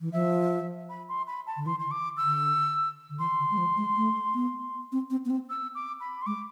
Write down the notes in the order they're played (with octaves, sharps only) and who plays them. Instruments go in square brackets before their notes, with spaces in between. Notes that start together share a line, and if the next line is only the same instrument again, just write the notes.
[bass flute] E3
[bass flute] F3 [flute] E5
[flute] B5
C6
B5
A5
[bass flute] D3
[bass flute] E3 [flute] C6
[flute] C6
[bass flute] D3
[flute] D6
E6
[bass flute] D3
D3
[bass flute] E3 [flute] C6
[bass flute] D3
G#3
F3
G#3
A3
B3
C4
C4
B3
C4
[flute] E6
D6
B5
C6
[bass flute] G#3 [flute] D6